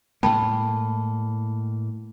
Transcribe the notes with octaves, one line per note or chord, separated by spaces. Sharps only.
A2 G#3 A#3 G5 A5 B5